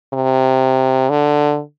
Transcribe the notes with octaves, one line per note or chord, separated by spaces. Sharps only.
C3
D3